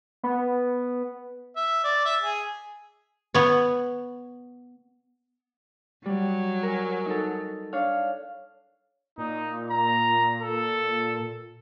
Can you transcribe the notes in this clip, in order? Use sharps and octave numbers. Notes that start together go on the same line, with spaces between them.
B3
E5
D5
E5
G#4
B3 C#5
F#3 G3
A#4 G#5
D#4 A4
D4 C#5 F5
A#2 D#4
A#5
A4